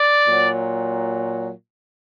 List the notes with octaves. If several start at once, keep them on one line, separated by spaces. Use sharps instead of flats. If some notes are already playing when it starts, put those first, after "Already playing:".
Already playing: D5
A#2 F#3